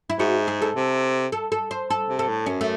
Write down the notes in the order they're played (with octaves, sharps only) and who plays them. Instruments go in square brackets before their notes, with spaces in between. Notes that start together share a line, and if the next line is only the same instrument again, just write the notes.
[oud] E4
[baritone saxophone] G#2 [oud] F#4
[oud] G#4
A4
[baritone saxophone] C3
[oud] A4
A4
C5
A4
[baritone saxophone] C3
[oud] A4
[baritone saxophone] A2
[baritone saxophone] F#2 [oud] C#4
[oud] A3